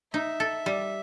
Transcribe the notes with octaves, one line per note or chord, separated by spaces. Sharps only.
D#4 E5
A4
G3